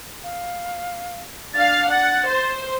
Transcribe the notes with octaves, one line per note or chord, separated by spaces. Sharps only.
F5
D4 F5 A6
F#5 A6
C5